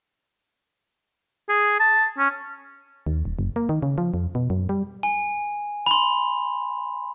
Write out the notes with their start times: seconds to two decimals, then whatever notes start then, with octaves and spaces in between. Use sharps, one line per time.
1.49 G#4
1.80 A5
2.18 C#4
3.07 D#2
3.25 D#1
3.39 F#1
3.56 A#3
3.69 D#3
3.83 C#3
3.98 F3
4.14 F2
4.35 B2
4.50 F#2
4.69 G3
5.03 G#5
5.86 B5 C6